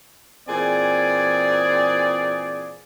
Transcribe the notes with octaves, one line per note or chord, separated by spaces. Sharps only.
A#2 E3 C4 G#4 D5 G#5